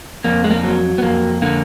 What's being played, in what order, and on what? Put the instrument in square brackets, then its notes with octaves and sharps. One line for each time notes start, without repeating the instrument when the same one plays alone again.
[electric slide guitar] F2 A#3
G#3
A#3
F#3
B3
F2 A#3
D3 A#3